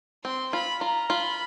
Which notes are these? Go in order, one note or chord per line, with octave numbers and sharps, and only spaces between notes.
C4 C6
F4 B5
F4 A#5
F4 B5